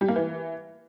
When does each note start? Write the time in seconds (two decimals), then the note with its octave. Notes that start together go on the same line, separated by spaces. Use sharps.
0.01 G3
0.08 A#3
0.16 E3